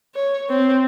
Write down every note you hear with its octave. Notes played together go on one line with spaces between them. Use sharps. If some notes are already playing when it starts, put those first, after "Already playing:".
C#5
C4